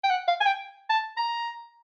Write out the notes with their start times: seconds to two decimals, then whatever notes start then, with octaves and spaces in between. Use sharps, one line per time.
0.04 G5
0.10 F#5
0.28 F5
0.41 G#5
0.46 G5
0.89 A5
1.17 A#5